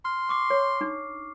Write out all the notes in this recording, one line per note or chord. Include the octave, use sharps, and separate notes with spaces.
C6 F6
C#6 D6 C7
C#5
D4 D#4